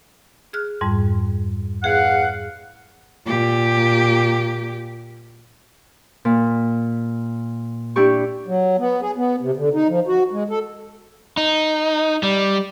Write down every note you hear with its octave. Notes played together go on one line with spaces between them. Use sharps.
G#4 F6 F#6
F2 G#2 G3
E2 G#4 F5 F#5
A#2 G4
A#2
D4 E4 G4 C#6
F#3
B3
G#4
B3
C3
D3
D#4
F3
F#4
G#3
A4
D#4
G3